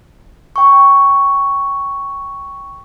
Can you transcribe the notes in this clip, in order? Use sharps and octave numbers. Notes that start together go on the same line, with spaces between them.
G5 C#6